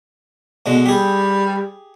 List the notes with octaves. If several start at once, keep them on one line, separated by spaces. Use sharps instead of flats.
B2 D3 G#3
G3 G4 G#4